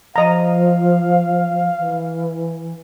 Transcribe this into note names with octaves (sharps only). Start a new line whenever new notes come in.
F3 D#5 F5 A#5
E3